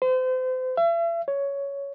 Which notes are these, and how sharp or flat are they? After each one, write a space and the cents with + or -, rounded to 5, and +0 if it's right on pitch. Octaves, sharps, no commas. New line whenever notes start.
C5 -35
E5 +40
C#5 +10